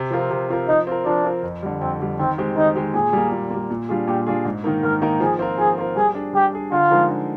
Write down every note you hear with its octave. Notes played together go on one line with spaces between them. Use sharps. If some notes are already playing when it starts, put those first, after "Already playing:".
Already playing: C3
F3 C4 F4 A#4
C3
F3 C4 F4 A#4
F3 D#4
C4 F4 A#4
F3 D4
C4 F4 A#4
F2
D3 G3
F2 C4
D3 G3
D#3 C4
G#3 C4 G4
D#3 D#4
G#3 C4 G4
A#2 G#4
G3 A#3
A#2
G3 A#3
A#2
G3 D4 F4 G#4
A#2 G4
G3 D4 F4 G#4
G#2
D#3 A#3 D#4 A#4
G#2 A#4
D#3 A#3 D#4 A#4
F3 G#4
C4 F4 A#4
F3 G#4
C4 F4 A#4
G3 G#4
D4 G#4
G3 G4
D4 G#4
D3 F4
F3 G#3 D#4 A#4
D3